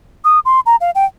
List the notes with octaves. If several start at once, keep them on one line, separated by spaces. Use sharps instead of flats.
D#6
C6
A#5
F5
G5